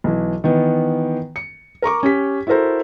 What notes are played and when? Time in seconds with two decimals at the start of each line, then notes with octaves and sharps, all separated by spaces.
0.04 B1 E3
0.44 D#3 E3 B3
1.36 C#7
1.82 A#4 A#5 C#6 D6
2.03 C#4 G4 B6
2.47 E4 F#4 A4 A#4 C5